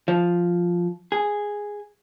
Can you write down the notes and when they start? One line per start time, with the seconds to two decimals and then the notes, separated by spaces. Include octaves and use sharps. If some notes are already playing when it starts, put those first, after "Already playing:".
0.08 F3
1.12 G#4